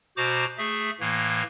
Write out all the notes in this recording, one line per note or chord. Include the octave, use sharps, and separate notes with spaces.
B2 F#4 C5 A#5 D6
A3 G#4 E5
A2 E3 A#3